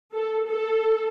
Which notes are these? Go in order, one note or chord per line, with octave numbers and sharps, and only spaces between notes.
A4
A4